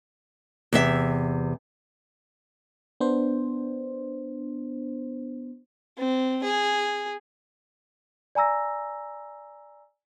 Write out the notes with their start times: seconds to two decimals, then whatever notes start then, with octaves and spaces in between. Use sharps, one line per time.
0.73 E2 C3 E5
3.00 B3 D4 C5
5.98 C4
6.44 G#4
8.35 D5 G#5 A#5 E6 A#6